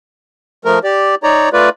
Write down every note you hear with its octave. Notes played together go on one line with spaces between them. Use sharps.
F3 A3 A#4
G4 D5
D#4 C#5 D5 A#5
A3 F4 B4 D5